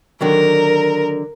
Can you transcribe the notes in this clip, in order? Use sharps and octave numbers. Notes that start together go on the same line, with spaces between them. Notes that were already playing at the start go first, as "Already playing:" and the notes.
D3 D#3 F#3 A#4